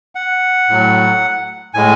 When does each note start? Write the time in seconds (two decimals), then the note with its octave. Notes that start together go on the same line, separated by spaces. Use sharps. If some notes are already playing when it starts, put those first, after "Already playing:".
0.15 F#5
0.69 A2 F#3
1.74 A2 G#3 G#5